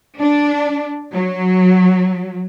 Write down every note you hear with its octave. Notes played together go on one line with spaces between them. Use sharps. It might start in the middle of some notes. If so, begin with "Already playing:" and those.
D4
F#3